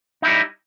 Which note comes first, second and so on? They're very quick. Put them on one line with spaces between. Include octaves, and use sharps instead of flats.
D#4 E4 G3